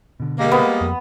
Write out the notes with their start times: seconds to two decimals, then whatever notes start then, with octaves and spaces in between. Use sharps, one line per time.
0.20 B2 D3
0.38 G3 G#3 A#3
0.52 B3
0.81 F2